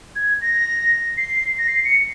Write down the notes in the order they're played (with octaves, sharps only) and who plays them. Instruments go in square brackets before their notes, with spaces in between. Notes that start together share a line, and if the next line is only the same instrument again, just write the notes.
[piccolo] G#6
A#6
C7
A#6
C7
C#7